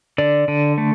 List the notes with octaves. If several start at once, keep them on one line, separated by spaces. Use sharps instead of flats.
D3 D5
D3
A3